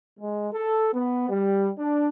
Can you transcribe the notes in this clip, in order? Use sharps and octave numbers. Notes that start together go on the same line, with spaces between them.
G#3
A4
B3
G3
D4